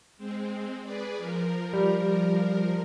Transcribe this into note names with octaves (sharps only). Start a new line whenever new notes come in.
G#3 C4
G#4 B4 D5
F3 A#4
G3